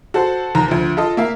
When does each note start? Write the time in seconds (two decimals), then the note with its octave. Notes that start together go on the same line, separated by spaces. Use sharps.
0.14 F#4 A4 C5
0.55 D#2 A#5
0.68 D2 F3
0.97 F4 A4 D#5
1.17 A#3 E5 F5